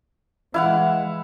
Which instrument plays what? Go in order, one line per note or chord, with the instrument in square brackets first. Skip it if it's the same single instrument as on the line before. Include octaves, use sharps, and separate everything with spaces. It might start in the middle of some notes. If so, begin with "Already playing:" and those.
[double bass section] E3 G#3 [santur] E4 F5 F#5